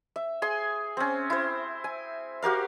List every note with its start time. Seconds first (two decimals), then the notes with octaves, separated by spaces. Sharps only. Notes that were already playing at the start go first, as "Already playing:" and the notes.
0.16 E5
0.42 G#4 G#5 C6
0.97 C4 C#4
1.30 E4 C5
1.84 G#5
2.42 F#4 G4 A#4 F5